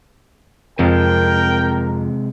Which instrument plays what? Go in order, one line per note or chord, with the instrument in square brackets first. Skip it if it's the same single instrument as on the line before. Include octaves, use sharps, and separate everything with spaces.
[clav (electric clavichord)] F2 [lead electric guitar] C3 G#3 [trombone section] A#4 [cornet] G5